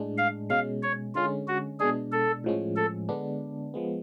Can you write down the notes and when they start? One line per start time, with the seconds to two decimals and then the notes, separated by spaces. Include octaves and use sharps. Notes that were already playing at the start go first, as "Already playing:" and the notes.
Already playing: A2 G#3 D4
0.18 F5
0.50 B2 G#3 C#4 F5
0.83 C#5
1.15 D3 G#3 C#4 F4
1.48 F#4
1.80 B2 G#3 D4 G#4
2.12 A4
2.44 A2 F3 G#3 C#4
2.76 A4
3.09 D3 G#3 B3 D4
3.74 F3 G#3 B3